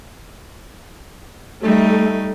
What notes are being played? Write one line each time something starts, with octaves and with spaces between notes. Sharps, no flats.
G3 A3 D#4